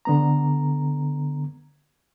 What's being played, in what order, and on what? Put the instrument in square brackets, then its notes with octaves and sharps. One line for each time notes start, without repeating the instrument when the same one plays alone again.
[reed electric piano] D3 B3 A#5